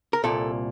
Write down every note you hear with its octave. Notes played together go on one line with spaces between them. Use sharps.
A#4
C2 A#2 A4